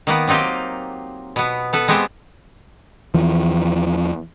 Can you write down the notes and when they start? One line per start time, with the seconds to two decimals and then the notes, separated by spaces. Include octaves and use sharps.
0.07 D#3 A#3 B3
0.27 F#3 C4 D#4 F4 G4
1.36 B2 B3
1.73 B3 A4 B4
1.88 G#3 B3 C4 G4 E5
3.14 E2 E3 F3